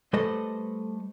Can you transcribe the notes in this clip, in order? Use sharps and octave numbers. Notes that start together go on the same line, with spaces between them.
G3 A3 A4 B4 C5 D#5